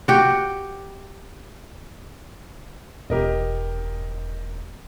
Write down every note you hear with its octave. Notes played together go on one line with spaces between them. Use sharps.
F#4 G4
E1 G4 A#4 D#5